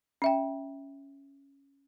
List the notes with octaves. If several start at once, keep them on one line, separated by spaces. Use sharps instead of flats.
C#4 E5 G5